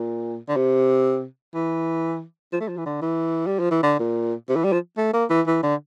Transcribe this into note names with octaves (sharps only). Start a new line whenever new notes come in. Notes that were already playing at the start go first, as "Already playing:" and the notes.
Already playing: A#2
D3
C3
E3
F3
A3
F3
E3
D3
E3
G3
F3
E3
D3
A#2
C3
E3
G3
F3
A3
A#3
E3
E3
D3